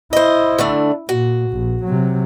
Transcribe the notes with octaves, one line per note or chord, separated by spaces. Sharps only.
E4 C5 D#5
D3 A3 D4
A#2 F#4
A#1
C3 F#3